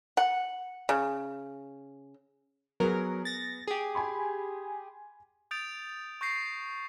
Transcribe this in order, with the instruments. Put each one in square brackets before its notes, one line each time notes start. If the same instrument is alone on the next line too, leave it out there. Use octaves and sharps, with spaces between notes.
[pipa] F#5
C#3
[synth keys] F#3 A#4 [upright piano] B3 G#4
[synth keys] A6 A#6
G4 G#4
[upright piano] G#5 B5 C6
[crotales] D#6 G6 A6 D7 F7
C#6 G6 A#6 C7